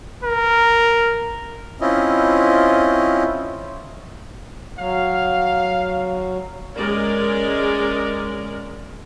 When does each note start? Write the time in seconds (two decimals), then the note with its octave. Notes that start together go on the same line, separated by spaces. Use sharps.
0.24 A#4
1.81 C4 C#4 E4 F4 D#5
4.78 F#3 F5
6.76 G#3 C#4 A#4 D5